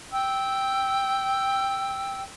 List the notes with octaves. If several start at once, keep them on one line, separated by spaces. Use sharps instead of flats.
G5 E6